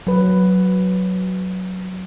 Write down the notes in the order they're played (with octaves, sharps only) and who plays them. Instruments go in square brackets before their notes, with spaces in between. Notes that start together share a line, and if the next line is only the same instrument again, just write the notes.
[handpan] F#3 B4